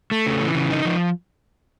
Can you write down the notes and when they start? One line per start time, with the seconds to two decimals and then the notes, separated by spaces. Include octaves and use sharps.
0.11 A3
0.26 C#3
0.41 E3
0.55 C#3
0.70 D#4
0.85 F3